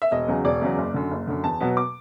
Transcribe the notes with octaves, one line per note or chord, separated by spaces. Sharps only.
E5
E1 D#5
E2 C#3 F#3
E1 D5
E2 C#3 F#3
F#1
F#2 D3
F#1
F#2 D3
E2 A5
B2 F#3 B3
D6